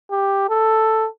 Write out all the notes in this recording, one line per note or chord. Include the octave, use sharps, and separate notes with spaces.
G4
A4